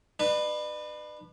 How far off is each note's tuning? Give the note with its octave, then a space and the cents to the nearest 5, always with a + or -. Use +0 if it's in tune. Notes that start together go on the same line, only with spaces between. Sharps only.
D4 +45 B4 +0